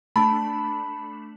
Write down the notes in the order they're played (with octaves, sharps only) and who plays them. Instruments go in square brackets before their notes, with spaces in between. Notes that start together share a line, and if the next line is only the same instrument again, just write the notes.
[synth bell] A3 D4 [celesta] A5 [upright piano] B5